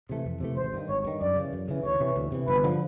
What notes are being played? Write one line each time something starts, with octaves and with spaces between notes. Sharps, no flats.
C3 E3 A3
F2
C3 E3 A3
G#1 C5
G2 D#3
G#1 C#5
G2 D#3
F#2 D5
C#3 E3
F#2
C#3 E3
D2 C#5
C3 E3
D2
C3 E3
G1 B4
D3 F3